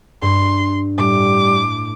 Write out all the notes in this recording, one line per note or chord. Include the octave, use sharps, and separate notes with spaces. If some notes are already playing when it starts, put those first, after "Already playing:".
G2 C6
A2 G3 D6